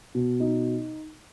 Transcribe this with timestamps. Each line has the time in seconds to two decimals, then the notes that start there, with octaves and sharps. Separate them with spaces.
0.15 B2
0.40 D#4